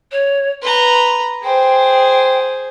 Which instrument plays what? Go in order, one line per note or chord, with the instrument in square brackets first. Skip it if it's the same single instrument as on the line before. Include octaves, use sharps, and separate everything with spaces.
[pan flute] C#5
[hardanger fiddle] B4 A#5 [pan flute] C6
[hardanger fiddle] G#4 C5 [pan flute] G5